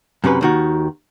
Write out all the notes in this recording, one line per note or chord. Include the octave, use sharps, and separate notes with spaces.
F#2 C3 C#4 B4
D#2 D#3 F#4